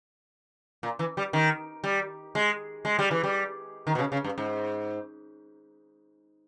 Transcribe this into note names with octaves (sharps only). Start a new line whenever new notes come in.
A#2
E3
G3
D#3
G3
G#3
G#3
G3
E3
G3
D#3
B2
C#3
C#3
G2
G#2